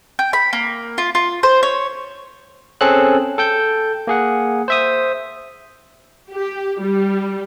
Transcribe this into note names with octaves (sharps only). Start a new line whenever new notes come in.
G5
B5
A#3
F4
F4
C5
C#5
C4 C#4 G#4 A4 F#6
A4 G5 G6
A#3 G#4 F#5
C5 E5 D#6
G4
G3